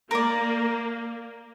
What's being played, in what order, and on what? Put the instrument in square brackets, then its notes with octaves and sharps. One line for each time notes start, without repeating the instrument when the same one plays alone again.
[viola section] A#3 [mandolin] A#4 D5